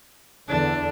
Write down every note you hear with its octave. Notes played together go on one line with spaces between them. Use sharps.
E2 D3 D4